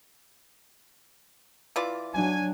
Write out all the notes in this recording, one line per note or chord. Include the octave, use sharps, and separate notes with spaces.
E3 F4 D5
F#3 D4 G#5